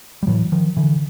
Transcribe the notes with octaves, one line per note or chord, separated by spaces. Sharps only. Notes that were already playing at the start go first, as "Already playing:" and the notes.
G3
A2 E3 F#3
D#3 F3
D3 E3